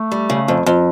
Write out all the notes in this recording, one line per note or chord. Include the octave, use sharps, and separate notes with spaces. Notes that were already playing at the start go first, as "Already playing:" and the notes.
Already playing: A3
G3
C#3
F2
F2